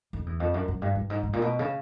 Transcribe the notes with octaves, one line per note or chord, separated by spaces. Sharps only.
F2
E2
F2
F#2
F#2
G2
G2
G#2
G#2
A#2
B2
C#3